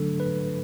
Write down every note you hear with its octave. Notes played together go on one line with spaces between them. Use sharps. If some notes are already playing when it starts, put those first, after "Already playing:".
Already playing: D3 F#3 A3 D4 A4
B4